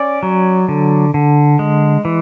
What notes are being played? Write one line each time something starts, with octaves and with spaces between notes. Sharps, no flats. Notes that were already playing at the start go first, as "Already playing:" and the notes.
Already playing: C#4 D5
F#3
D3
D3
G#3
E3